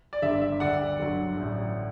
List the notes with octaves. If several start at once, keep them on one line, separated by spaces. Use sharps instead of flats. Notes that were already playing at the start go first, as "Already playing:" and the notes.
D5
G1 G2 D3 E5
E5
D2 D3 G3 D5 F#5
G1 G2 D3 F#3
A1 A2 F#3